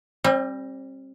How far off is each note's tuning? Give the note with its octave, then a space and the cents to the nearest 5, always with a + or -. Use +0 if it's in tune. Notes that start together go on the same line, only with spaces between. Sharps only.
G3 +0 C4 +35